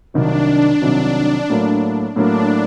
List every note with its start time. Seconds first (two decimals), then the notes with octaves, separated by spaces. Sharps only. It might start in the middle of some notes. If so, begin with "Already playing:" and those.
0.14 C2 C3 D#3 F#3 D4
0.82 C2 C3 D#3 F#3
1.50 A2 F#3 A#3
2.16 A2 F#3 A#3 D4